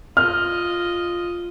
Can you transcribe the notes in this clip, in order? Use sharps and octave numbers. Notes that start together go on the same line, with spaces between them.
F4 D#5 F6